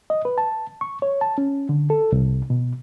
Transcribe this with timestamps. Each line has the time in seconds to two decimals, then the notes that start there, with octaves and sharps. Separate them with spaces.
0.10 D#5
0.25 B4
0.38 A5
0.81 C#6
1.02 C#5
1.21 A5
1.38 C#4
1.69 D3
1.90 A4
2.12 C2
2.50 B2